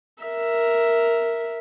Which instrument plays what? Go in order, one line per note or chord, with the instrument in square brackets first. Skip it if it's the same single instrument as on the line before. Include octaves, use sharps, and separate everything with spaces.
[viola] A#4 E5